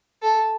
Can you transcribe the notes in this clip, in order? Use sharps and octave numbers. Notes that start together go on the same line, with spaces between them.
A4